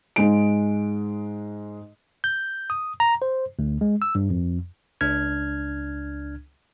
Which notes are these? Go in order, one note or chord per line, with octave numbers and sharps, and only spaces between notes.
G#2 G#3 D7
G6
D#6
A#5
C5
D2
G#3
E6
G2
F2
C#2 D4 F6 G#6